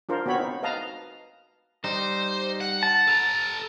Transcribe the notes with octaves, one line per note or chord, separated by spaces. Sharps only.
D4 F4 A#4 C5
B3 C4 F#4 C#5 B5
D#4
B4 D#5 F5 A5 A#5
G3 D#4 C5
F#5
A5
A4 A#5